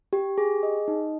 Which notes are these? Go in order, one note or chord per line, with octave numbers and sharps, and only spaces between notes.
G4
G#4
D#5
D#4